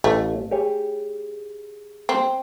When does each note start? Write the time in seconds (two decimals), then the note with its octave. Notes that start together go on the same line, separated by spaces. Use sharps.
0.04 A1 A3 F5
0.51 G4 G#4 C#5
2.09 C4